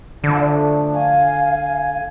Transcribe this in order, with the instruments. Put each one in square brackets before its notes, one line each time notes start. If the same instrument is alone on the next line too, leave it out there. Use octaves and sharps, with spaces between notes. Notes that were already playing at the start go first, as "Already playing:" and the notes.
[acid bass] D3 [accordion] F3 A3 D4
[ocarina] F5 [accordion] G#5